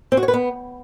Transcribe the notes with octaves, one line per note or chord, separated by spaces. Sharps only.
C4
F#4
C#5
B4
B3